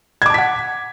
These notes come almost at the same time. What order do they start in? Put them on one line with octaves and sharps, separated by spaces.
G#6 D6 A5 B6 F#5